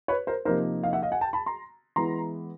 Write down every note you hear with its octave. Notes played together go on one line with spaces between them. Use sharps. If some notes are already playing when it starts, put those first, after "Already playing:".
B4 C#5
A#4 C5
C3 F3 A#3 D#4 A#4 C5
D#5 F5
E5 F#5
D#5 F5
F#5 G#5
G5 A5
A5 B5
A#5 C6
E3 G#3 B3 E4 A#5 C6